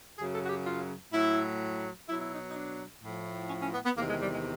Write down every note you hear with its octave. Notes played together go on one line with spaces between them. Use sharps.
F#2 C#3 F#3 G#4
A4
F#4
G4
F4
A2 F#3 E4
B2 F#3 E4
E4
D#4
D#4
D4
A2 F3
C#4
C#4
B3
B3
E2 C3 D#3 A#3
G#3
G3
G#3